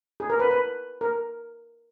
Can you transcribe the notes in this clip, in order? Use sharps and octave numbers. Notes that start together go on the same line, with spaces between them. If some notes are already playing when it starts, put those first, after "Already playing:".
G#4
A#4
B4
B4
A#4